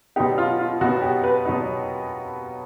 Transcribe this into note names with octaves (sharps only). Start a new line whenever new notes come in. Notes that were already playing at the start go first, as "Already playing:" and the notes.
B2 F#3 B3 D#4 G4
F4
F4
B2 F#3 B3 D#4 F#4
G4
B4
B2 F#3 B3 D#4